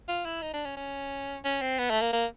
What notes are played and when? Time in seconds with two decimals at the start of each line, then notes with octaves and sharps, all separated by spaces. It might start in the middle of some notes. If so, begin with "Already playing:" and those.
0.08 F4
0.25 E4
0.42 D#4
0.53 D4
0.65 C#4
0.77 C#4
1.45 C#4
1.62 C4
1.79 B3
1.90 A3
2.01 A#3
2.13 A#3